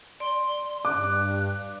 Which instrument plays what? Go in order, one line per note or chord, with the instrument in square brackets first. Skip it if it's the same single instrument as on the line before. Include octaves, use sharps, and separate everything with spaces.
[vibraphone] D5 [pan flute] C6
[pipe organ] G2 [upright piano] D6 [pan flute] F#6